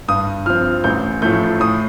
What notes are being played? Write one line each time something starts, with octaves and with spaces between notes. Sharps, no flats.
G2 D#6
F3 C4 F6
A1 G6
A2 F3 A3 G6
A2 D#6